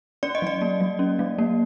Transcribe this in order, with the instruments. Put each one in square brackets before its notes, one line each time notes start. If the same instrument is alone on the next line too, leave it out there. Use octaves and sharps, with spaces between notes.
[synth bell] C#4 D5
D#5
F#3 D5
A#3
F#3
C#4
F#3
A#3